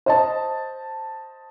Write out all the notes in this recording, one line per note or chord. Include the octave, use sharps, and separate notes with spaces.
C5 D#5 A5